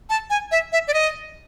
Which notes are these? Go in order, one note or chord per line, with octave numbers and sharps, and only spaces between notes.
A5
G#5
E5
E5
D5
D#5